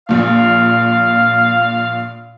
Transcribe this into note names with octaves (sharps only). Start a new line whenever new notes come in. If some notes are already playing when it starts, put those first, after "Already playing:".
A#1 A#2 F5